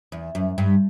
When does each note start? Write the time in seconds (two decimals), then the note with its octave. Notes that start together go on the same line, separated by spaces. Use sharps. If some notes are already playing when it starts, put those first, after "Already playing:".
0.12 E2
0.35 F#2
0.58 G2